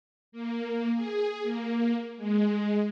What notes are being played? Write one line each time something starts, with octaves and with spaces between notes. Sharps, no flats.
A#3
G#4
A#3
G#3